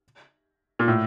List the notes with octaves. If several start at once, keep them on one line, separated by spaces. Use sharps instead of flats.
A#2
A2